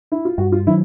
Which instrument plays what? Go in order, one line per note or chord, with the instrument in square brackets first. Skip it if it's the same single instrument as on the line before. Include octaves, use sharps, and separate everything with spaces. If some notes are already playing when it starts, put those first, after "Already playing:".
[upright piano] E4
F4
[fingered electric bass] G2 [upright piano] F#4
[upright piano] F4
[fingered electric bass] D#3 F#3 [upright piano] E4